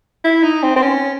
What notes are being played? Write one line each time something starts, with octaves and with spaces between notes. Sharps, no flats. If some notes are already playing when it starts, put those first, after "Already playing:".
E4
D#4
C4
C4
C#4